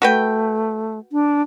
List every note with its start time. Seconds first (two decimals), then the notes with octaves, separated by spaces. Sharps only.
0.02 A3 F#4 B4 G5
1.12 D4